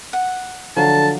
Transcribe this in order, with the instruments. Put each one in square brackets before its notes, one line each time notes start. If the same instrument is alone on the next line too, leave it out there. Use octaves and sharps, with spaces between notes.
[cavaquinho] F#5
[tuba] D3 [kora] F3 F#3 [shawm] A5